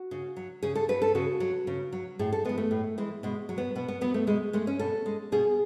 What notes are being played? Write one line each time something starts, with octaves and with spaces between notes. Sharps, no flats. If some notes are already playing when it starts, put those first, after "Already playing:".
Already playing: F#4
C#3
F#3
C#3 G#4
A4
F#3 B4
A4
C#3 F#4
F#3
C#3
F#3
A2 G#4
A4
E3 G#3 B3
A3
A2
E3 G#3
B2 G#3
F#3
B3
B2 B3
B3
F#3 B3
A3
B2 G#3
G#3 A3
C#4
B2 A4
G#3
B2 G#4